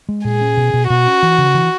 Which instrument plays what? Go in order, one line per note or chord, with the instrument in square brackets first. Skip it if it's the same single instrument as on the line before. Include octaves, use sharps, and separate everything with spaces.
[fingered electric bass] G#3
[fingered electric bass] A#2 [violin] G#4
[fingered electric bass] C#4
B2
B2
[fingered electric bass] B2 [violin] F#4
[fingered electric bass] C#4
E3
C#3
E3